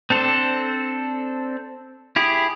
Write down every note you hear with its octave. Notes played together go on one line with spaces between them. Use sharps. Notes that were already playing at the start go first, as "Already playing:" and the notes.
C4 D4 A4 C5
E4 G4 G#4